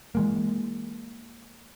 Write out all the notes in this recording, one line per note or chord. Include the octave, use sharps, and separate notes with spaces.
E3 G#3 A#3